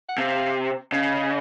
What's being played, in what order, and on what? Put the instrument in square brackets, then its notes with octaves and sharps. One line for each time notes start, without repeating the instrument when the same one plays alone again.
[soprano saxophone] F#5
[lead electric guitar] C3 [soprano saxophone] F5
[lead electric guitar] C#3 [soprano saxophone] D#5